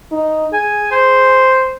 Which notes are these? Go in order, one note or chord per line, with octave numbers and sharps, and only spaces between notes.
D#4
G#4 G#5
C5